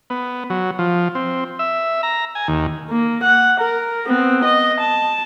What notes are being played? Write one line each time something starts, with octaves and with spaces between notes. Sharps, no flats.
B3
F#3
F3
C4
E5
A#5
G#5
D#2
A#3
F#5
A#4
B3 C4
D#5
A5